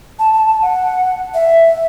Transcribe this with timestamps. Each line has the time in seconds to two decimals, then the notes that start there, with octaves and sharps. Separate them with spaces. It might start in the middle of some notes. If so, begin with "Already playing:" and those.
0.19 A5
0.33 A5
0.48 A5
0.62 F#5
1.34 E5